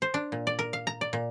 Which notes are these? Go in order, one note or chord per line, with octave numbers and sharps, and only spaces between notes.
C5
D4
A#2
D5
A#4
F5
A#5
D5
A#2